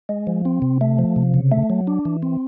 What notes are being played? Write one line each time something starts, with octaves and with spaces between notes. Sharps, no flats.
G#3
F3
C4
C3
A3
F3
C3
C#3
A3
F#3
D4
E3
C4